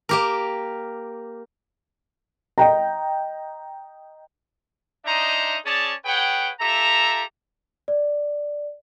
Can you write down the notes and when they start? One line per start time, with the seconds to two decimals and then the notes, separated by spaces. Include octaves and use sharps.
0.09 A#3 G4 A#4
2.58 D#5 G5 A#5
5.06 D4 D#4 C5 D#5 E5 A#5
5.65 C#4 G#4 C#5 D5 A5
6.05 G#4 B4 C#5 F#5 G5
6.60 F4 G4 A4 E5 A#5
7.88 D5